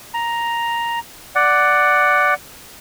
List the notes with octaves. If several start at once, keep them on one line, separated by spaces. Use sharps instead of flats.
A#5
D5 F#5